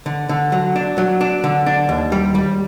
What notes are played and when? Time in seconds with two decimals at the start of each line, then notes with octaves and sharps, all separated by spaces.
0.06 D3
0.29 D3
0.52 F#3
0.76 D4
0.98 F#3
1.21 D4
1.44 D3
1.66 D4
1.89 D#2
2.12 G3
2.35 G3